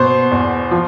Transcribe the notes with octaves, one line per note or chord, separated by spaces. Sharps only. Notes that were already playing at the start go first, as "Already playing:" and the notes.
Already playing: B2 C5
E2
F3